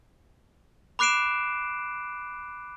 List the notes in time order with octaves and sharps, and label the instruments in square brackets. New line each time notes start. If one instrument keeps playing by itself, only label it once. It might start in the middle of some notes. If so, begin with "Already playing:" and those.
[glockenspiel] B5 D6 F#6 C7 D7 E7